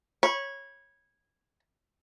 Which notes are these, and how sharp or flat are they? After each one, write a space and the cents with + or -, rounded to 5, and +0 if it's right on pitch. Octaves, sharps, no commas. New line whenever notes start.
C#5 -10 B5 -20